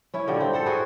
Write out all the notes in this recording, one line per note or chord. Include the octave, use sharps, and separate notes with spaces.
C#4 E4
A#2 D3 G3
C4
A4 C5 F#5
E4 F#4 G#4